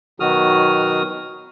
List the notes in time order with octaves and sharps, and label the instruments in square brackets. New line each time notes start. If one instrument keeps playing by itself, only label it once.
[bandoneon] B2 D#3 F#3 F#4 D#6 F6